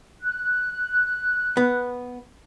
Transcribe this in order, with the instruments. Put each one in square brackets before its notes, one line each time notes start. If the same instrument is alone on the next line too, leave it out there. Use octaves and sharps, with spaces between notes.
[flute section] F#6
[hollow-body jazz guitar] B3